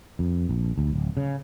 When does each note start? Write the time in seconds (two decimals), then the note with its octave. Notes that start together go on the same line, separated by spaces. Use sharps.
0.19 F2
0.49 A#1
0.78 D2
0.93 D1
1.17 C#3